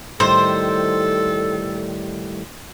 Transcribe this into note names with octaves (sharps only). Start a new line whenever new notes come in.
A2 D#3 G3 A4 C5